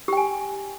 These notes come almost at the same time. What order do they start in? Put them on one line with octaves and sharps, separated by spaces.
G4 G5 G#5